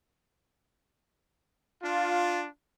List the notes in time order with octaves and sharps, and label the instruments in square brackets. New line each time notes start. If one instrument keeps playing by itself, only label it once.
[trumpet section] D4 F4